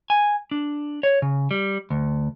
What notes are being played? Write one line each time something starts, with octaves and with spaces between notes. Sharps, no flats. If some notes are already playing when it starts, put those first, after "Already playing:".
G#5
D4
C#5
C#3
G3
D2